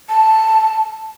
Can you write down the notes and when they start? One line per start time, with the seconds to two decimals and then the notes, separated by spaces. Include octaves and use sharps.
0.09 A5